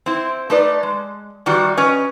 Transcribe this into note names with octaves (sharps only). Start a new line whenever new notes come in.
C4 E4
A3 D#4 B4 D5
G#3
D#3 E3 G3 F#4
C#4 B4 D#5